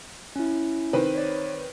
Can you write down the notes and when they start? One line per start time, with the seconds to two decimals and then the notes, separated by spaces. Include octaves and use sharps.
0.36 C#4 E4
0.93 D#3 C4 B4
1.15 C#5 D5